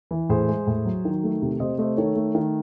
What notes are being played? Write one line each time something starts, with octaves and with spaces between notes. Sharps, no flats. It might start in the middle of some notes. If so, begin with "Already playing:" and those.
E3
A2 G#4 C5
G#3
A2
F#3
D#3
A3
C3
C3 C5 D#5
A3 C5 D#5
D#3 A4 C#5
A3
D#3